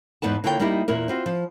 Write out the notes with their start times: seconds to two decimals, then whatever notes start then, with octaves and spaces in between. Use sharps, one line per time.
0.22 E2 G#2 B3 B4 A5
0.44 D3 A#3 E4 F4 C#5 G5
0.59 G3 A#3 D#4 E4 G4
0.88 E2 A#2 E4 A#4
1.08 C4 F4 F#4
1.26 F3